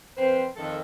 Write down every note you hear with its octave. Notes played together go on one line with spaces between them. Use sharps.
F2 C4 B4 C5
F2 D#3 A4